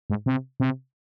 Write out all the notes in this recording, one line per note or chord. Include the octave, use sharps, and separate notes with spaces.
G#2
C3
C3